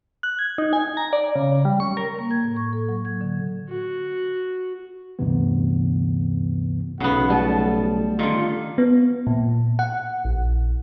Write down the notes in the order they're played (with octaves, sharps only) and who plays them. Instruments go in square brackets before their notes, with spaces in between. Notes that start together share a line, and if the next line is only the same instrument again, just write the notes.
[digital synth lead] F#6
G#6
D#4
G#5
A#5
D5
C#3
G3
C#6
A#4
[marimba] A#3
G#6
A2
C#6
A4
F#3
G#6
D3
[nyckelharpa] F#4
[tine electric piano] D2 G2 C3 E3 B3
[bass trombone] B1 [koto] C#3 B3 [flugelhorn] F#5
[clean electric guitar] G3 A3 F#5 [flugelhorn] A5
[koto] D3 D#3 [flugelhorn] F4
[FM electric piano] B3
A#2
F#5
A#1